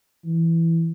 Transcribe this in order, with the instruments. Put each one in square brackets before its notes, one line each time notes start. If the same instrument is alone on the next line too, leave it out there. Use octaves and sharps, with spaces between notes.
[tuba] E3